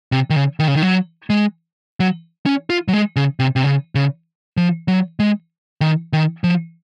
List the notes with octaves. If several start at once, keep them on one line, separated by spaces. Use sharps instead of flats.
C3
D#3
C#3
D#3
C#3
D#3
F#3
G#3
F#3
C#4
F4
F#3
G#3
C#3
C3
C3
C#3
C#3
F3
F#3
G#3
D#3
D#3
F3